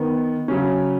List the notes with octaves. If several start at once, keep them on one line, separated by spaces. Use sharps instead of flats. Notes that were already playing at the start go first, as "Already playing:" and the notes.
Already playing: D#3 B3
C#3 F#3 C#4